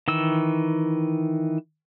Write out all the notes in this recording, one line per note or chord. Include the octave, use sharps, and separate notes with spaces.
D#3 E3 E6